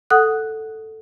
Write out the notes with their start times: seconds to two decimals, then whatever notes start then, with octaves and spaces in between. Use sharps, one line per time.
0.10 A4 F#5 D#6 F#6